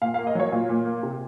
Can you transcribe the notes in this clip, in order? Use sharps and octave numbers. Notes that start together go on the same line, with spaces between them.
A#2 F5
F5
A#3
D#5
F#3 C#5
A#2 F4
A#2
A#3
C3